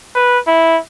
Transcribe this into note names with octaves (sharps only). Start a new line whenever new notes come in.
B4
E4